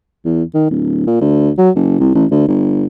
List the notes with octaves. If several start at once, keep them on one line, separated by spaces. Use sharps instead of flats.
E2
D#3
D1
A#2
D2
F#3
F#1
C2
A1
D2
G1